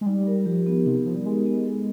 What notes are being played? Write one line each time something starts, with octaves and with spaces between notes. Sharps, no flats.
G#3
G3 D#4
A#4
F3 G4
B3
C3 D#4
F3 A#4
G3
G#3 G4
B3
A4